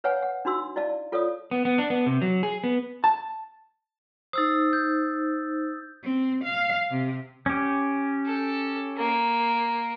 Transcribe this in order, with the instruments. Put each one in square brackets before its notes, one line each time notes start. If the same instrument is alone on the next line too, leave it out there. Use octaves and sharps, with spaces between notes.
[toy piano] B4 C#5 F5 F#5 G#5
F#5
D4 D#4 F#4 C6 E6
E4 D5 D#5 F5 A5
F4 A4 C#5 D5 F5 D#6
[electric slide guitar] B3
B3
D4
B3
C3
F#3
G#4
B3
[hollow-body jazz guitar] A5
[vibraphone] D#4 C5 [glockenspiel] D#6 E6 A6
[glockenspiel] G6
[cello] C4
F5
C3
[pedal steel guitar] C#4 G4
[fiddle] A4
A#3